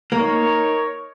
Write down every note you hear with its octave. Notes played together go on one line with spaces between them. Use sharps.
A#3 D#4 A#4 C#5